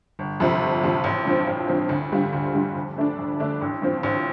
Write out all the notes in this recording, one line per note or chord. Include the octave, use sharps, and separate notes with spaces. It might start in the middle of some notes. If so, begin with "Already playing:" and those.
G1
F2 C3 F3
G1
F2 C3 F3
A1
G2 F3 C4
A1
G2 F3 C4
D2
D3 G3 F4
D2
D3 G3 F4
F2
D3 A3 D4
F2
D3 A3 D4
A1
G2 F3 C4
A1